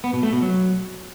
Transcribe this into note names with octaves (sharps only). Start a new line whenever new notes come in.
B3
B2
A3
B2
F#3